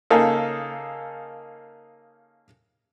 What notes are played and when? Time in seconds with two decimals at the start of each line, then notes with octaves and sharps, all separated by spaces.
0.10 C#3 A#3 D#4 G#4 A4